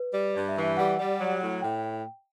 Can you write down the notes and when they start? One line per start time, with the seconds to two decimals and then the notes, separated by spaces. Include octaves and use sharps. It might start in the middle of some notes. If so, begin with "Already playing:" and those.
Already playing: B4
0.13 G3
0.35 G2 D5
0.49 E5
0.57 E3
0.63 E5
0.77 G3 F#5
0.98 G3
1.19 F#3
1.41 A2
1.62 A2 G5